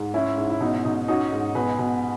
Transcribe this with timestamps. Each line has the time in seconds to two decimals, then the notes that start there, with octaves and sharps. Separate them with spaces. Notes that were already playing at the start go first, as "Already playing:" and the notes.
Already playing: G#2
0.14 C#4 E4
0.38 G#2
0.50 E4
0.60 B2 D#4
0.85 B2 D#4
1.08 C#4 D#4 F#4
1.32 G#2
1.55 B2 G#4 B4
1.78 B2